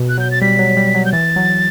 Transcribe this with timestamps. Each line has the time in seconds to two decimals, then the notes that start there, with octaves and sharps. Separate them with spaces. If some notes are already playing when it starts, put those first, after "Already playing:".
Already playing: B2
0.09 F#6
0.18 F#3 G6
0.31 A6
0.42 G3 B6
0.59 F#3
0.77 G3
0.95 F#3
1.05 G6
1.12 E3 A6
1.36 F#3